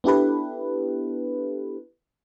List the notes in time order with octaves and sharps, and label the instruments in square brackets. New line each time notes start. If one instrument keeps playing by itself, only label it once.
[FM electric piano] B3 D4 E4 G4 A4 B4